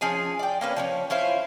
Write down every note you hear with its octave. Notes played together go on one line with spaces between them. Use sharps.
F3 C#4 G#4 G#5
D5 G5
A#3 C#4 B4
F3 B3 C#4
C#4 E4 F4 C5